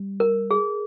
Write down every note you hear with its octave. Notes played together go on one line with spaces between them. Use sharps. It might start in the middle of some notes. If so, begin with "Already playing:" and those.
Already playing: G3
A#4
G#4